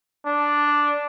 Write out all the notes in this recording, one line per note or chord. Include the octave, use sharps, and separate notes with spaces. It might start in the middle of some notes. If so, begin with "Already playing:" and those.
D4